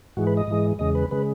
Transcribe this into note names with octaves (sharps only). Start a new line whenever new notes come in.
G#2 E3 G#3 F#4
B4
D#5
G#2 E3 G#3
E2 C#3 G#3 D#5
B4
C#3 G#3 B4